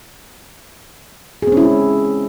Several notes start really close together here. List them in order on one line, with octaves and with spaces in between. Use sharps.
G#4 C4 C#4 E4 G#3